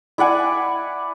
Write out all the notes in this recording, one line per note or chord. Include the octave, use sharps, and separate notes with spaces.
E4 D5 F#5 G#5